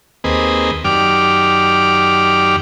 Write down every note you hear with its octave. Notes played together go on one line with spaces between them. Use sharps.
D#2 A#3 C4 G#4 B4 D#5
F#2 D#3 G4 D5 D6 F6